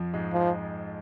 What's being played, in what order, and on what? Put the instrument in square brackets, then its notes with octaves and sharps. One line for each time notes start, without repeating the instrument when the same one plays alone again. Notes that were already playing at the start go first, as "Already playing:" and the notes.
Already playing: [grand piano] F2 F3
G#2 G#3
[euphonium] F3